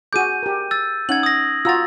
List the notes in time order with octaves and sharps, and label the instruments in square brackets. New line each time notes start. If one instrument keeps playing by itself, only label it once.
[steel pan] F#4 G#4 D6 [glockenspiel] G6 D#7
[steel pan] G4 A#4
[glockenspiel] E6 A6
[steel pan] C#4 D#4 F#5 [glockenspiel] G#6 F#7
[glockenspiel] D#6 A#6
[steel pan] F4 F#4 A#5 [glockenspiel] E6 A6